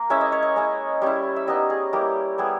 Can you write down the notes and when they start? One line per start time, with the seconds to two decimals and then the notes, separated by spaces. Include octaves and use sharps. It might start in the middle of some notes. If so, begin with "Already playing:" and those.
Already playing: A#3 A#5
0.10 G#3 C#4 E4 E5
0.21 D#5
0.32 C#5
0.42 D#5
0.56 G#3 C#4 E4
1.02 G3 C#4 E4
1.36 E5
1.47 G3 B3 D#4 D#5
1.70 G#4
1.93 G3 A#3 E4 G4
2.38 G3 B3 E4 G#4